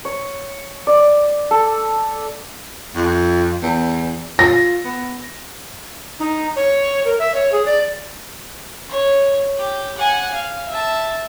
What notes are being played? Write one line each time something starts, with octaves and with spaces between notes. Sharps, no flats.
C#5
D5
A4
F2
E2
F4 A#6
B3
D#4
C#5
A#4
E5
C#5
G#4
D5
C#5
G4
F#5 G#5
F5
E5 A5